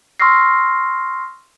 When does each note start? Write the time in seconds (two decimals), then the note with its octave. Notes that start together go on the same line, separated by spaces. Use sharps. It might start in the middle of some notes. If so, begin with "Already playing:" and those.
0.20 C6 C#6 E6 F6 A#6 C7